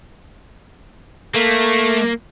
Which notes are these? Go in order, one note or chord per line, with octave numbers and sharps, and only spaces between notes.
A3 A#3